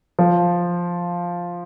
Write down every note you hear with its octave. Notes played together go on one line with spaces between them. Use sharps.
F3